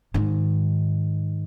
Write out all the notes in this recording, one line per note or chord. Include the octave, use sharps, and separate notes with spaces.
G#2 D#3